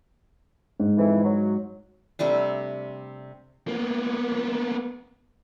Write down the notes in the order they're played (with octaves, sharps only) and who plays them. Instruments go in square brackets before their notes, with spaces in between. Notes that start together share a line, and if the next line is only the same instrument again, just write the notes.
[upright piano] G#2
[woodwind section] F2 E3
F#3
[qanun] C3 G3 A3 D4
[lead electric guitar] A#3 B3